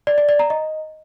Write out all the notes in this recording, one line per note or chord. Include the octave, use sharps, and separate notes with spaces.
D5
D5
D5
A#5
D#5